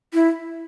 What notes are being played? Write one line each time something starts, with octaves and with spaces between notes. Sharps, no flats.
E4